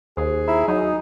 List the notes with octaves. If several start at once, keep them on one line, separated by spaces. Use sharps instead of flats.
D#2 G#4 C5
E4 A#5
F#3 D#4